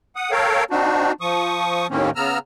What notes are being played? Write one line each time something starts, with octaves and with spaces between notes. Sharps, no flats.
F#5 D#6
A4 A#4 C#5 F5 G5
C4 D4 D#4 F#4
F3 C#6 D#6
D#2 A2 D#3 A#3 C4 C#4
C#3 B3 A#5 E6 F6